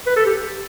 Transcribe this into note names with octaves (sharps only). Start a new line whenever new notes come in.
B4
A4
G4